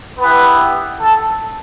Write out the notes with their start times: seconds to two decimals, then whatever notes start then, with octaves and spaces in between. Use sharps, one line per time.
0.19 B3 E4 G4 B4
1.01 A4